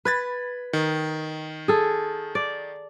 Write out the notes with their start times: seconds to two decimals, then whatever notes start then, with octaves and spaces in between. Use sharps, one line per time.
0.05 B4 B5 G#6 A6
0.73 D#3
1.68 G#4 A4
2.35 D5